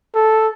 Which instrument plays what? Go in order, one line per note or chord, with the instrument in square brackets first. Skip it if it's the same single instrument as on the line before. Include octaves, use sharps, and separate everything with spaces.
[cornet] A4